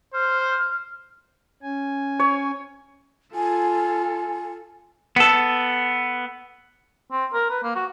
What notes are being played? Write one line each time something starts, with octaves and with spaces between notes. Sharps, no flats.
C5 F6
C#4 G#5
C#5
F4 A4 G#5
B3 A4
C4
A#4
B4
A#3
F#4